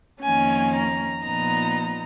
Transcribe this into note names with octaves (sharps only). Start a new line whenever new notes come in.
F2 D#3 A#3 C#4 G#5
A#5
A#2 F3 B3 D#4 A#5